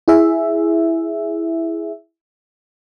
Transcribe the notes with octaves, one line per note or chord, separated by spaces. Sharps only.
E4 G#4 E5